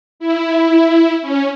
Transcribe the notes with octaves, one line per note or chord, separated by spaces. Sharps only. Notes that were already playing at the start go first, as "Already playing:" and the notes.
E4
C#4